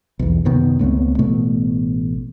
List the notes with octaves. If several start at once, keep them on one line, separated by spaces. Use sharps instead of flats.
B1 E2
F#2 C3 D#3 B3
C#2 A3 B3 C4
A1 B2 A3 B3